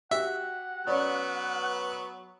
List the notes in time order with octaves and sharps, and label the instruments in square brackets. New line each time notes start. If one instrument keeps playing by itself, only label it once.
[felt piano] F#4 G4 [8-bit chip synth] E5 [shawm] F#5
[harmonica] F#3 B3 B4 [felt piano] C#4 C#5 D5